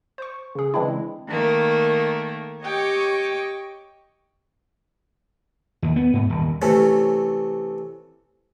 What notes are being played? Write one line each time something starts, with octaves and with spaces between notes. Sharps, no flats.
C5 C#6
C#3 G#4
C#3 E3 G#3 C4 D4 E4
D#3 A3 A#3
G4 C#5 D#5 G5 C#6 D6
D#2
B3
G#2
D#1
C3 E3 A3 C#4